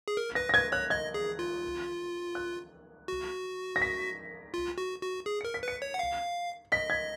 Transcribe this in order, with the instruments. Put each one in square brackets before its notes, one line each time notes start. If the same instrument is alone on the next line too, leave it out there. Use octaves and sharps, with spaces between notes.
[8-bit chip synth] G#4
A#4
[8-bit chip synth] B4 [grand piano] A#6
[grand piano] A#6
[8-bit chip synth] B4 [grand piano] G#6
[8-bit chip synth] C#5 [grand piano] F#6
[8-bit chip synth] D#5 [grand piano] G#6
[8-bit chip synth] G#4
F4
[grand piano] F#6
[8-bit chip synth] F#4
[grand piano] A#6
B6
[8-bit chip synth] F4
F#4
F#4
G#4
[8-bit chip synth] A#4 [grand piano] C#7
[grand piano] B6
[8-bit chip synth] B4 [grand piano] C#7
[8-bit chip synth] C#5
F#5
F5
[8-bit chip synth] D#5 [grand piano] B6
[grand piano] G#6